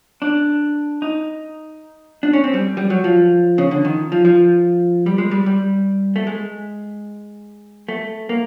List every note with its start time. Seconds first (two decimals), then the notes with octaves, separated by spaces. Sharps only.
0.22 D4
1.02 D#4
2.23 D4
2.33 C#4
2.44 C4
2.54 G3
2.77 G3
2.90 F#3
3.04 F3
3.58 C#3
3.71 D3
3.85 D#3
4.12 F3
4.25 F3
5.06 G3
5.18 G#3
5.31 G3
5.46 G3
6.16 A3
6.27 G#3
7.89 A3
8.29 A#3